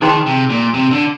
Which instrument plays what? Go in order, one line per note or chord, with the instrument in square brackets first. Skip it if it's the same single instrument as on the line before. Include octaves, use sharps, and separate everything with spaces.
[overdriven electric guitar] D#3 [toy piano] D#4 G#4 C5 G5 C6
[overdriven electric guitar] C3
A#2
C3
D3